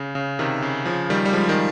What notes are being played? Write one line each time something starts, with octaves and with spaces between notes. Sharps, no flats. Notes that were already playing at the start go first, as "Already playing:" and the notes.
Already playing: C#3
C#3
C3 D#3
C#3
C#3 F3
D#3 G3
G3
F3 G#3
D#3 G3